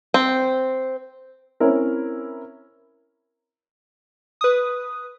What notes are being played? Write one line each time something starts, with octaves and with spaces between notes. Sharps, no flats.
C4
C4 C#4 E4 A#4
B4 D#6